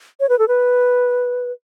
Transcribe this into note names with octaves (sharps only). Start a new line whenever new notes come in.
C#5
B4
A4
B4